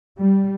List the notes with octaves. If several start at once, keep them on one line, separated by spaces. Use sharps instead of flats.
G3